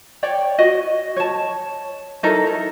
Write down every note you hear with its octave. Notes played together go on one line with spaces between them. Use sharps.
C#5 D5 G5
F#4 D#5
C#5 A5
D#4 E4 A4 A#4
A#4